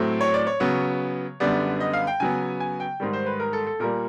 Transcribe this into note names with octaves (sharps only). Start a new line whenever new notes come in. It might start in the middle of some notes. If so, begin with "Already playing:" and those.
Already playing: A2 F#3 A3 C4
C#5
D5
C#5
C#3 F#3 B3
F#2 D3 G3 B3 D5
D#5
F5
G5
C#3 F#3 B3 G#5
G#5
G5
G#2 D#3 G3
C5
B4
A#4
A4
A4
A#2 G3 A#3 A#4